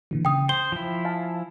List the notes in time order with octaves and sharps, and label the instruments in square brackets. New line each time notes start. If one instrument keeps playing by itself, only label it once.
[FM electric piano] A#2 D3 E3
[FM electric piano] C#3 [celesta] G5 D#6
[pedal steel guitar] C5 [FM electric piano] G5 [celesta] G7
[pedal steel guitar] F3 E4
[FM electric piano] F5 G#5 A5